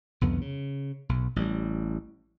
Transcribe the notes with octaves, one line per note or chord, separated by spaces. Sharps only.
C2 F2 D3 B3
C#3
B1
A1 G3